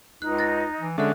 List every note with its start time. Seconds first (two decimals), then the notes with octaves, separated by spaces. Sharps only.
0.22 C#2 D#4 F#6
0.38 F#6 A6 A#6
0.80 E3
0.98 D3 G#3 C#4 D4 E5 F#6